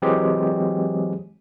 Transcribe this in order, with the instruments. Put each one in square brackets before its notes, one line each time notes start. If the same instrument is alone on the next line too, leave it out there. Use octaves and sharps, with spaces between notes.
[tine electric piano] E3 F#3 G#3 C4 G4 G#4